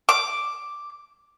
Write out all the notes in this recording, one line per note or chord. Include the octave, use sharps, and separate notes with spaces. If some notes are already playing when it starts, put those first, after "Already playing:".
D6